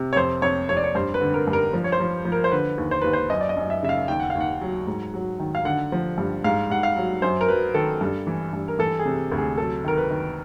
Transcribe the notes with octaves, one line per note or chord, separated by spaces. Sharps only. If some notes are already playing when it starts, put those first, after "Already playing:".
Already playing: C3
C#5
F2 C5
F2 C#5
F2 C#5
D5
C#5
G2 C5
B4
D3
A#4
G2
A#4
F3
C#5
C5
F3
F3
A#4
C5
D3 B4
D#2
C5
D#2 B4
C5
F#2 D#5
D5
D#5
F#2
E5
C#3 E5
F5
D#2 G5
F#5
F5
D#2 F#5
F#3
G#2
F#3
D#3
F5
D3 F#5
F3
G2
G#2 F5
G#2 F#5
F5
F#3
F#2 C5
A#4
F#3 B4
D#3 A4
G2
E3
G2
A#4
E3 A4
G#4
C3
D2
G#4
F#3 A4
D#3 A#4
B4
D#3